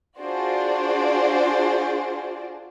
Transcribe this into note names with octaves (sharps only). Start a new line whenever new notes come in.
D4 F4 F#4 G#4 C5 D5